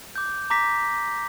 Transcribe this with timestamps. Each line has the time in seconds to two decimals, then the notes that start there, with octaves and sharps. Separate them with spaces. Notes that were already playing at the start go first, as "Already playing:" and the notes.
0.16 D6 G6
0.50 A#5 D6 A#6 B6